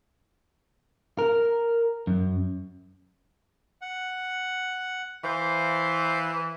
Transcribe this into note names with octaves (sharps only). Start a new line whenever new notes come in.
A#4
F#2
F#5
E3 C5 F5